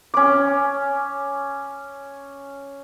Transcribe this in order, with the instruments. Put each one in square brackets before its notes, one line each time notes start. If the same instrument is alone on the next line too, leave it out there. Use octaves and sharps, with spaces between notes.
[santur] C#4 D6